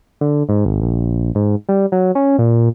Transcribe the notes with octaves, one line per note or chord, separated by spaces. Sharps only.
D3
G#2
G#1
A#1
G#2
G3
F#3
C#4
A#2